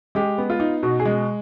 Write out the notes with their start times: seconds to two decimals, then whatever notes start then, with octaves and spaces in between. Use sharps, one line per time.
0.15 G#3 G4
0.38 B3
0.50 F4
0.60 D#4
0.83 B2 F#4
1.00 G#4
1.05 G#3